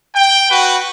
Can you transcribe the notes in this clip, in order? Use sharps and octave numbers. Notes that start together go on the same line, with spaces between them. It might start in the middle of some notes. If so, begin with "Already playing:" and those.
G5
F#4 B4